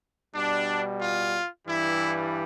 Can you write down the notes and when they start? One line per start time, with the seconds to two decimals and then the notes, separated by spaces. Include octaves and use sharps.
0.35 B2 G3 D4
1.01 F4
1.67 G2 E3 G3 E4